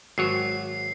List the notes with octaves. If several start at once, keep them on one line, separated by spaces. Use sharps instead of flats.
G#1 F#3 C#5 C7